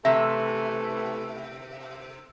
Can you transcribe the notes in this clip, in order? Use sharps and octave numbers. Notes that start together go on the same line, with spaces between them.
C3 E3 A3 E5